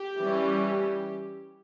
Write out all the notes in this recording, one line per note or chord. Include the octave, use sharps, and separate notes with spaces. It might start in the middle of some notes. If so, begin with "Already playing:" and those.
Already playing: G4
E3 G3 C#4